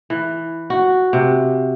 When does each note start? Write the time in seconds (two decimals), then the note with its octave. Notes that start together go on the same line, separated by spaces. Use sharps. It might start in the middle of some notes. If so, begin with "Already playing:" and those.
0.10 E3
0.70 F#4
1.13 C3